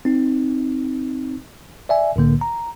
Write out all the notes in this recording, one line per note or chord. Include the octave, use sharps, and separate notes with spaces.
C4 D#4
D5 E5 G#5
C2 A2 D3 A#3
A#5